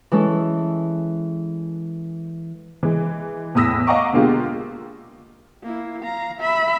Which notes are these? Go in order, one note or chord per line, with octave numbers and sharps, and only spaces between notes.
E3 G#3 C#4 A4
E3 G#3
E2 A2 D#6 E6 A#6 B6
D#5 F5 F#5 A#5 C#6 D6
B2 D3 G#3 A#3 F4 G4
A#3 E4
F5 A#5
E5 B5